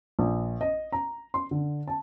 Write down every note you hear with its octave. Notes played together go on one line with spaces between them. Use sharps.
A#1
D#5
A#5
C6
D3
A5